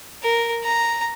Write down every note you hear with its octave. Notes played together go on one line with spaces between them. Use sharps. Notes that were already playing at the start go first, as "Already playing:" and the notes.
A#4
A#5